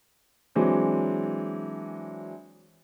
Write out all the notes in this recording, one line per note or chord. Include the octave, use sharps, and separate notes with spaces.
E3 F#3 G#3 C4 D4